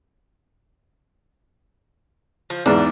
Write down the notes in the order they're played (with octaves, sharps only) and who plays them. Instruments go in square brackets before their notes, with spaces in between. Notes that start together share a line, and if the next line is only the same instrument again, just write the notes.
[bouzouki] F3
[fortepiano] E2 G#2 [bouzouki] D4